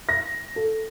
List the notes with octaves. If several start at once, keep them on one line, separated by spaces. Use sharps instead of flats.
A#6
A4